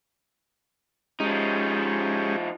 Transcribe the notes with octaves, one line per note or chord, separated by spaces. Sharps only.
F3 G#3 C#4 D#4 G4